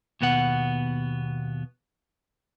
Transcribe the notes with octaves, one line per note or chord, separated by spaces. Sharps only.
D#2 B2 B3 F#5